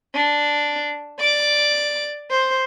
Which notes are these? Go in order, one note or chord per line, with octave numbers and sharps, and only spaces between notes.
D4
D5 D6
C5